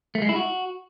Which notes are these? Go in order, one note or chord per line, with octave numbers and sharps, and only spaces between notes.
A3
G#3
E4
F#4